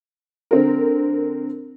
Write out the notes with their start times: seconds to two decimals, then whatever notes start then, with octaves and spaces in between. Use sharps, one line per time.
0.51 D3 C4 A#4